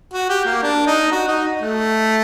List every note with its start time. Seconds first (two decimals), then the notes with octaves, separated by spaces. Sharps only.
0.13 F#4
0.30 G4
0.45 A#3
0.63 D4
0.87 D#4
1.12 F#4
1.28 D#4
1.62 A3